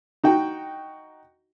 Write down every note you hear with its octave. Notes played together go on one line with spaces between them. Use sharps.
D#4 F#4 G5